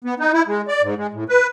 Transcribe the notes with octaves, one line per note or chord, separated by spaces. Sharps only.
B3
D#4
E4
G#3
D5
G#2
G#3
A2
B4